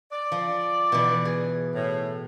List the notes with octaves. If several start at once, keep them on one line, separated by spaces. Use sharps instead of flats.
D5
F3
B2 E3
G#4
A2